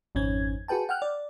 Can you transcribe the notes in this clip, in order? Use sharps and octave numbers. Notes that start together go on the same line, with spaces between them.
G#1 F2 C#4 G#6
F#4 G#4 B4 G5 A5
F#5 G5 F6 F#6
D5